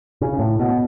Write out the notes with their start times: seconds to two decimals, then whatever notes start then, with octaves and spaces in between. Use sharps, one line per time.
0.21 C#3
0.39 A2
0.59 B2